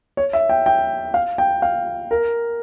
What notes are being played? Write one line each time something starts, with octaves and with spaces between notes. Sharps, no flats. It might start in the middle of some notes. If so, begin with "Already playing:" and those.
C#5
E5
G5
G5
F5
G5
F5
A#4